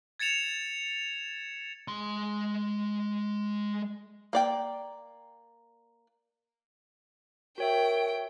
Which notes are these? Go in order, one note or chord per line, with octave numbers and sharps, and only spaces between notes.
G#6 A6 C#7 E7 F7
G#3 C6
A#3 D5 G5
F#4 A#4 C#5 E5 G5